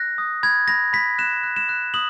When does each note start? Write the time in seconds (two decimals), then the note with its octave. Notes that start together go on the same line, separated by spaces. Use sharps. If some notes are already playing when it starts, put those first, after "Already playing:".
Already playing: F#6 A#6
0.18 D#6
0.43 B5 G#6
0.68 B5 A#6
0.93 B5 B6
1.18 F#6 E7
1.43 F#6
1.56 E7
1.69 F#6
1.94 D#6 F#7